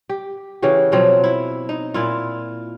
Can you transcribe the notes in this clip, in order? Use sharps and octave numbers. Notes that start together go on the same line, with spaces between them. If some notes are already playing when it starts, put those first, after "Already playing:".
G4
C#3 E3 F#4 G4
B2 F3 F#3 C4
E4
D#4
A#2 E4 F4